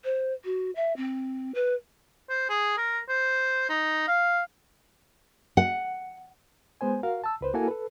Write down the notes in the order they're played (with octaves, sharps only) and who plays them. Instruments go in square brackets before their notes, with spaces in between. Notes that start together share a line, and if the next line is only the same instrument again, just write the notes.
[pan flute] C5
F#4
E5
C4
B4
[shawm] C5
G#4
A#4
C5
D#4
F5
[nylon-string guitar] F#5
[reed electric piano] G#3 B3 C5 G#5
F#4 A#4 F5
A5 E6
C#2 B4 C5
A#3 E4 F#4 A4 A#4 G#5
A4 B4